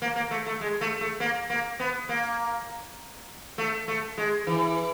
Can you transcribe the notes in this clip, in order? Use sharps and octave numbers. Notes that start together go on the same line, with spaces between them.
A#3
A#3
A3
A3
G#3
A3
A3
A#3
A#3
B3
A#3
A3
A3
G#3
E3